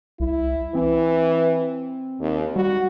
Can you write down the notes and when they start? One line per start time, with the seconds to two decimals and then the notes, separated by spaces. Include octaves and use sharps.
0.20 C2 E4
0.75 E3 C4
2.21 D#2
2.56 G3 F#4